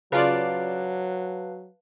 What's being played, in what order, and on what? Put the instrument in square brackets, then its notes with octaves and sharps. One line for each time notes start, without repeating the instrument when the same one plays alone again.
[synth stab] C#3 F4 D5 [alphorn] F#3 [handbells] B4 F5 A5